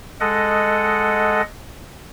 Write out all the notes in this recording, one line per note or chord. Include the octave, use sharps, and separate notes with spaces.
G#3 A4 D#5 F#5